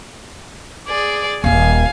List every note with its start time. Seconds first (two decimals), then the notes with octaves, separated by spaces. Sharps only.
0.88 G#4 D5
1.44 D#1 D#2 F5 G#5